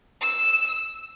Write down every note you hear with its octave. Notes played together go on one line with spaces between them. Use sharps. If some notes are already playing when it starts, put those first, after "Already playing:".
E6